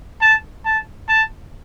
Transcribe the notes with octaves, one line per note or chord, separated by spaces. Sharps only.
A5
A5
A5